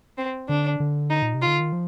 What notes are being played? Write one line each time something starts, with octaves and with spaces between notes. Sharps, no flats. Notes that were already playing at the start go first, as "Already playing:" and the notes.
C4
D3 D4
D3
D#4
A#2
C3
F4
D3
D#3
F3